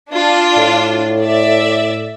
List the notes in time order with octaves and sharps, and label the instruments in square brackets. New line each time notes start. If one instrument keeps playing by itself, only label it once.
[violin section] D4 F4
[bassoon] A2
[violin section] D5 E5